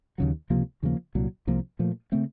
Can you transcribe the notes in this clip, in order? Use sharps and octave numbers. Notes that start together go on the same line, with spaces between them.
D#2 C#3 F#3
C#2 C3 F3 A#3
D#2 C#3 F3 A#3
C2 A#2 F#3
C2 C3 F3 A#3
A#2 F3 A3
C#3 A3 C4